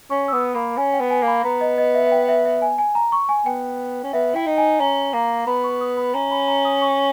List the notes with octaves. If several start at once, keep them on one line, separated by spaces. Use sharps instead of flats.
C#4 C#6
E6
B3 D#6
A#3 B5
C#4 G#5
G5
B3
G#5
A#3
B5
B3 A#5
D#5
D#5
E5
E5
G5
E5
E5
G#5
G#5
A#5
C#6
G#5
B3 G5
C#4
B3 E5
E4 G5
D#4
G#5
C#4 A#5
A#3 A#5
B3 B5
C#6
D#6
B5
C#4 A#5
B5
A#5
D#6
C#6